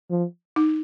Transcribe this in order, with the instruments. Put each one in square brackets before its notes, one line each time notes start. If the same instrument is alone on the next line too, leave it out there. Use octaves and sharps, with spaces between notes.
[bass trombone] F3
[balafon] D#4